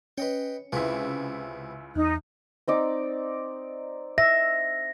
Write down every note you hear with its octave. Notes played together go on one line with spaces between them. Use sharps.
C#4 B4 D#5 G5
C#2 C3 E4 G#4 B4
E2 D#4
C4 D#4 D5
E5 A#6